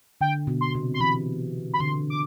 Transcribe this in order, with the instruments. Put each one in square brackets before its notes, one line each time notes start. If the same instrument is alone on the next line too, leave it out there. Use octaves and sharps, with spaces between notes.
[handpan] D3 [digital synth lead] G5
[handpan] B2
[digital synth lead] C6
[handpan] C3
[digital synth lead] C6
[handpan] E3 [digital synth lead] B5
[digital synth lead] B5
[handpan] D3 [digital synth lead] C6
[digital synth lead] D6